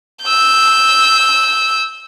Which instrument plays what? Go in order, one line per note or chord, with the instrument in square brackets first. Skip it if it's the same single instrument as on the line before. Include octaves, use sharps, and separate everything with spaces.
[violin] E6 G6